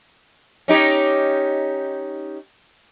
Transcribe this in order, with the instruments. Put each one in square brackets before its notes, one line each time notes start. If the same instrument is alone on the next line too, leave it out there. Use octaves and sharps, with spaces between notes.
[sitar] C#4 D#4 G4